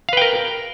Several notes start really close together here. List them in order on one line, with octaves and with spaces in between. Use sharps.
F5 B4 G5 A#4